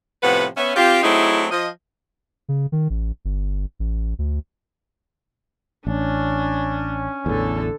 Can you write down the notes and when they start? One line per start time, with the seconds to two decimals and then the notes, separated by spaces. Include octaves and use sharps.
0.22 A2 C3 F3 B3 B4 F#5
0.57 B3 C#4 E5
0.76 C4 F4 G4
1.03 F#3 A3 C4 D#4 E4 G#4
1.51 F3 D#5
2.49 C#3
2.72 D#3
2.90 A1
3.25 G1
3.79 A1
4.19 D2
5.87 A1 C#4 D4
7.26 A1 E2 D3 A4